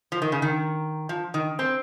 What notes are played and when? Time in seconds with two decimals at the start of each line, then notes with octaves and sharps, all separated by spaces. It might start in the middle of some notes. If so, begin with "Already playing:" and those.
0.12 F3
0.22 D#3
0.32 C#3
0.42 D#3
1.09 F3
1.34 D#3
1.59 C4